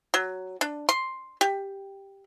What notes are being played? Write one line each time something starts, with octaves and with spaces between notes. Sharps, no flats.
F#3
D4
C6
G4